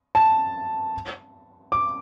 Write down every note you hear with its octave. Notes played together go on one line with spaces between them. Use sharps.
A5
D6